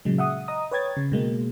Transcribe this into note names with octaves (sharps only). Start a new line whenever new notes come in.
A#2 C#3 F#3 G#3
E5 F#5 D#6
D#5 A#5 D#6
B4 C#5 G5 G#6 A6
C#3
B2 G#3 A#3